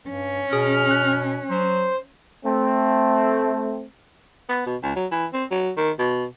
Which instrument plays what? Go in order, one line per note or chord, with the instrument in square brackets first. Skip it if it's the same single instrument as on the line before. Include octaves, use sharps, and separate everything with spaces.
[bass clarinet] G2 [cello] C#4
[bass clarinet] B2 [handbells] G#4 [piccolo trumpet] F6
[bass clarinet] B2 [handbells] F#6
[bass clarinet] F#3 [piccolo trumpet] C5
[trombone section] A3 C4
[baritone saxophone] B3
B2
C#2
F#3
E3
C4
F#3
D#3
B2